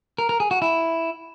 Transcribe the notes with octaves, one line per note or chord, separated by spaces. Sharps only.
A#4
A#4
G#4
F#4
E4